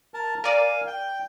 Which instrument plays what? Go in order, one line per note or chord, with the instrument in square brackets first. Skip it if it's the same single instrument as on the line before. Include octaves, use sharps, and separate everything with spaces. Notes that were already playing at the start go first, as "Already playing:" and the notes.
[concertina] A#4 A5
[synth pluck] A#4 D5 [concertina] F5 G#5
[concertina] G5